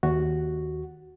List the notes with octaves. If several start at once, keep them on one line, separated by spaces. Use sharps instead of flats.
D#2 F#4